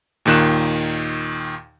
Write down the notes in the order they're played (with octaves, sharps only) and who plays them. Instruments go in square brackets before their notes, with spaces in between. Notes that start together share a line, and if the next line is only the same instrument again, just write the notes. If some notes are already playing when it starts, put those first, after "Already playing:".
[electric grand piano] D#2 A#2 D#3 F#6 E7